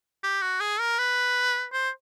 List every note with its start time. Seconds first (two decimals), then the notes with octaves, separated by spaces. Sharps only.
0.24 G4
0.42 F#4
0.60 G#4
0.80 A#4
0.99 B4
1.73 C5